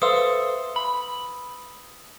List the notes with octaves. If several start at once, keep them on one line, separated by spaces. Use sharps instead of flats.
A4 B4 C5 E5 F5 C6 D#6 E6
B5